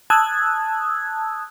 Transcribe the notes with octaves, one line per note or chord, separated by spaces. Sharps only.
A5 D#6 E6 F#6 G#6